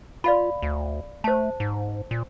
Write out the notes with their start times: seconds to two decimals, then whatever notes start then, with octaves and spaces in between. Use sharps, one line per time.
0.24 F4 D5 F5 B5
0.62 D2
1.24 A3 C5 A5
1.60 G#2
2.11 A#2